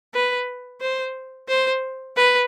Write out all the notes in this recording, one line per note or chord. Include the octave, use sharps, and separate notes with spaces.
B4
C5
C5
B4